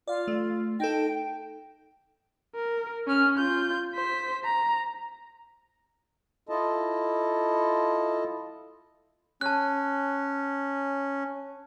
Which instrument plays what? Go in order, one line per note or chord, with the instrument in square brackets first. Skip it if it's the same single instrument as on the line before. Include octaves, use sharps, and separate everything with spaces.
[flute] F4 [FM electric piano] D5 F5
[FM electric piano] A3
[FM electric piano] D#4 A4 [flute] G5
[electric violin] A#4
C#4 F6
F4 G6
C5 B6
A#5
[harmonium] E4 F4 A4 D#5 A5
[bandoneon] C#4 [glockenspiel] A5 F#6